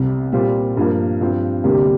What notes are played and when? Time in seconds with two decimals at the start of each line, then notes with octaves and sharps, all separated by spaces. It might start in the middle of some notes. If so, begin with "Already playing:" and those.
Already playing: C2 C3 G3
0.32 A#2 G3 C4 F4
0.77 G2 F3 A#3
1.21 G2 F3 C4
1.64 D2 C3 G3 A#3 D4